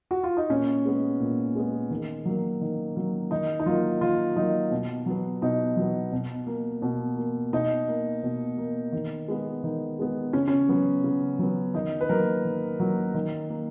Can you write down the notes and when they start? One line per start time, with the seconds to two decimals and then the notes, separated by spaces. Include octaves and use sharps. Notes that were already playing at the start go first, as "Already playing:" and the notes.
0.11 F#4
0.24 F4
0.37 D#4
0.50 A#2 C#4
0.85 G#3 B3
1.20 A#2
1.55 G#3 B3
1.90 D#3
2.25 F#3 A#3
2.61 D#3
2.96 F#3 A#3
3.31 D#3 D#4
3.60 D#4
3.66 F#3 A#3 F4
4.01 D#3 F4
4.36 F#3 A#3 D#4
4.71 B2
5.06 F#3 B3
5.42 B2 D#4
5.77 F#3 B3
6.12 B2
6.47 A#3
6.82 B2
7.17 A#3
7.53 B2 D#4
7.88 A#3
8.23 B2
8.58 A#3
8.92 D#3
9.28 G#3 B3
9.64 D#3
9.99 G#3 B3
10.33 C#3 C#4
10.48 C#4
10.69 F#3 B3
11.04 C#3
11.39 F#3 B3
11.74 D#3 D#4
12.01 B4
12.09 F#3 A#3 A#4
12.44 D#3
12.80 F#3 A#3
13.14 D#3
13.50 A#3